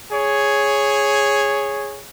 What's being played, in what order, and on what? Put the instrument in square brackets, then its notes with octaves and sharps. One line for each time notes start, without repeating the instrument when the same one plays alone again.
[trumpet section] G#4 C#5